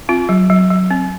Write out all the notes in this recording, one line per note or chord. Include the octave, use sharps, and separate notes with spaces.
C4 F4
F#3
F#3
F#3
C4